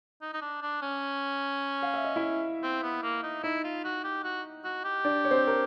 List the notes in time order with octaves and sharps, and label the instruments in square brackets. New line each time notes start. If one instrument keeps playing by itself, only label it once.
[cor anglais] D#4
D#4
D4
D4
C#4
[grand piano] F5
E5
D#5
E4 E5
[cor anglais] C4
B3
A#3
D#4
[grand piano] D#4 D#5 [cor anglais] E4
[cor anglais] F4
F#4
G4
F#4
F#4
G4
[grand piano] D4 D5
C#5
C4 C5
A#4